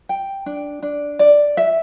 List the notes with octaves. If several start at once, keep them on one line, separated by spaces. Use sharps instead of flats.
G5
D4
D4
D5
E5